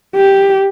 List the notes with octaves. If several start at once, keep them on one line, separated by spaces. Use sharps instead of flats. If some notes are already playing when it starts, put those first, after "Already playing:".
G4